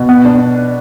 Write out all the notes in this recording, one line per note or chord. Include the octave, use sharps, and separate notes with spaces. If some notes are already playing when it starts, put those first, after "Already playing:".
Already playing: B2
B3
D4